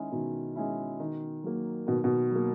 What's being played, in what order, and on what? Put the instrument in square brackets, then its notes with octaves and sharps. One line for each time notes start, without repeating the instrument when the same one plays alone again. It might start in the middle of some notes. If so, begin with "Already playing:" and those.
Already playing: [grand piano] D#3 G#3 C#4 E4
[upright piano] B2 [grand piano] D#3
[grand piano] G#3 C#4 E4
D#3
F#3 A#3
[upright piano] B2 [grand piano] D#3
[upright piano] B2
[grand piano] F#3 A#3